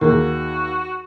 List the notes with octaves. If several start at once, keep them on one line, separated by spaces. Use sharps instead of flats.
D#2 F#4 G#4 A#4